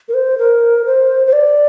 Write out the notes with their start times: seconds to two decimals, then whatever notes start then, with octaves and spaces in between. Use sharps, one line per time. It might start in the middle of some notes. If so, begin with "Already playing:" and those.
0.09 A#4
0.14 C5
0.38 A#4
0.86 C5
1.27 C5
1.33 D5